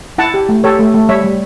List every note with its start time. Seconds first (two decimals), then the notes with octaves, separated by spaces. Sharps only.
0.18 E4 F#5 A5
0.34 G4
0.49 A3
0.64 G4 A4 C#5
0.79 A3
0.94 A3
1.09 G3 C#5 E5
1.24 G3